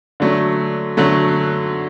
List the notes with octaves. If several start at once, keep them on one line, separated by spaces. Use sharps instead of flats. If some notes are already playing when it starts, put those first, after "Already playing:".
D3 F#3 A3
D3 F#3 A3